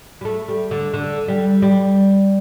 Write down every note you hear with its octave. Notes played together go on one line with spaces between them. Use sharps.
G3
A3
G3
D3
D3
G3
G3